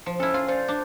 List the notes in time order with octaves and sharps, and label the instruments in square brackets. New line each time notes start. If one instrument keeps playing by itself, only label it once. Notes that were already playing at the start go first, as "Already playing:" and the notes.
[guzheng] F3
[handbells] C#4 F6 [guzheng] E4 A4
[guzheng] F4 [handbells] F5
[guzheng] F4 [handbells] C5 D5 A6
[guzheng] D4